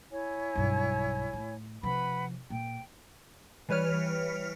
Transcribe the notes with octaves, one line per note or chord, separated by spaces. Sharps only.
E4 C#5 G#5
B1 G2
A2
C3 F3 B4 F#5 B5
A#2 G5
E3 G3 B4 C#5 F6